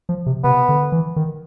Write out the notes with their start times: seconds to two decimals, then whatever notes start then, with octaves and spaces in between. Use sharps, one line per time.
0.09 F3
0.26 C3
0.44 C3 B3
0.69 D3
0.92 E3
1.16 D#3